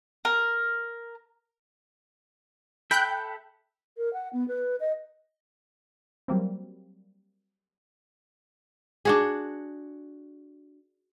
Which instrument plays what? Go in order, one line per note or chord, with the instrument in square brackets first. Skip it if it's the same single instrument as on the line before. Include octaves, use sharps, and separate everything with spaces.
[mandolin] A#4
[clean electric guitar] A4 E5 B5 [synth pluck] G5 F#6 G6
[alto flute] A#4
F#5
B3
B4
D#5
[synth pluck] F#3 G3 A#3 C4
[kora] D4 F#4 G#4